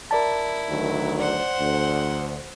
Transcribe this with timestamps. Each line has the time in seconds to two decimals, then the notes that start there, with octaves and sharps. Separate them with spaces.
0.11 E4 A#4 D5 A5
0.69 D2 D#3 F#3
1.20 C5 D5 F#5
1.59 D2